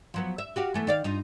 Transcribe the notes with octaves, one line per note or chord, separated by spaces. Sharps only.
F3 F#3 B3
E5
F#4 G4 F5
E3 A3 B3
D#3 D5 F5
G2 D#4 F4